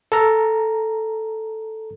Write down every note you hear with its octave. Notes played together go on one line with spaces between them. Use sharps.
A4 A#5